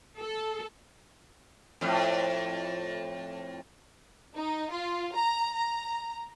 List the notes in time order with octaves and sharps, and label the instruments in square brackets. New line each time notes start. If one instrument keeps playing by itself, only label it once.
[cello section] A4
[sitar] F2 A2
[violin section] D#4
F4
A#5
A#5